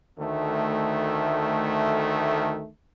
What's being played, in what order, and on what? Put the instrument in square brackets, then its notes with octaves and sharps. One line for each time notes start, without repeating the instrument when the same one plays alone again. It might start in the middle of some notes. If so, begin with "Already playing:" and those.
[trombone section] D2 D#3 A3